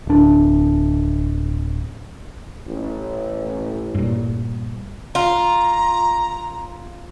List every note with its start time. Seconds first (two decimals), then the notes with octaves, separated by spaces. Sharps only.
0.07 D1 D4
2.67 A1
3.95 G2 A#2
5.15 F4 A#5